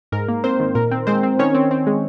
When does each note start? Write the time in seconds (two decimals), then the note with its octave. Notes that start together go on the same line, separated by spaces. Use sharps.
0.12 G#2 A#4
0.28 A#3
0.44 A#3 C4 C5
0.60 D#3
0.75 A#2 A#4
0.91 C4
1.07 G#3 C4 C5
1.23 C4
1.39 D#3 C#4 C#5
1.55 C4
1.71 C4
1.87 G#3